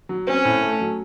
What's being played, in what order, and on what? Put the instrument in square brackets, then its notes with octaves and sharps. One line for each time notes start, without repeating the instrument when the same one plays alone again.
[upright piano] F#3
[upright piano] C4 [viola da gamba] C#4
[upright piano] A2
A3
F#3